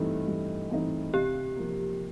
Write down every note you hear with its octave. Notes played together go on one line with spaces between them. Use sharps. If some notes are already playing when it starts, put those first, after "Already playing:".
Already playing: G2 E3 A3 C4 D#4
G2
E3 A3 C4 D#4
C3 G4
F3 A#3